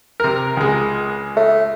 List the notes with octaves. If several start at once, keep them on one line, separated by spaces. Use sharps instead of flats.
C3 A#4
C#2 G#3
A3